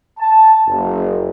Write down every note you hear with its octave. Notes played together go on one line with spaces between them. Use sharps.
A5
F#1